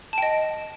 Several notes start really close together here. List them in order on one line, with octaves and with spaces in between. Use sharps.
A5 G5 D#5